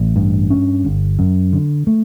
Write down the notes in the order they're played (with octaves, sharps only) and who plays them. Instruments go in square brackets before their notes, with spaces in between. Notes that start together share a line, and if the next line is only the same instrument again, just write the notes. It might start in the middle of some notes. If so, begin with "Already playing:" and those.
Already playing: [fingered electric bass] A1
G2
C#4
G1
F#2
D3
A3